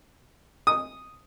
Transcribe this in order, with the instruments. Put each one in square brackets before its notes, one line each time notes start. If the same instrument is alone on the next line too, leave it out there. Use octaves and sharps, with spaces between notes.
[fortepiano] D#6